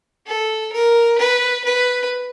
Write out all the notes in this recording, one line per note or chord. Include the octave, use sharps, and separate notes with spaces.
A4
A#4
B4
B4